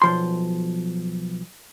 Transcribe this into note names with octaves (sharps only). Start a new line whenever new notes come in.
B1 F3 C6